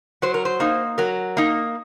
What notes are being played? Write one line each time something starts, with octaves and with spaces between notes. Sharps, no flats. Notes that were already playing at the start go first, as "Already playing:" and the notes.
F#3 C5
A#4
C5
A#3 D#4
F#3 A#4
A#3 D#4